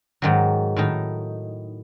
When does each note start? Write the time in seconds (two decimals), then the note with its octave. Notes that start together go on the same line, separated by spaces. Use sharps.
0.22 G#2 D#3 F#3
0.76 A2 D#3 D#4